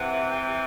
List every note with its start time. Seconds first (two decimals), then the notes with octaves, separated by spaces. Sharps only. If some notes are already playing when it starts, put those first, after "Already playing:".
Already playing: C3 E3 F#5
0.30 G5